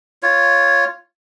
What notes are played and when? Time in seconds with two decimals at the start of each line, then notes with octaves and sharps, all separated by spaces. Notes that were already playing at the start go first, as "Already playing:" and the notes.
0.23 F4 C#5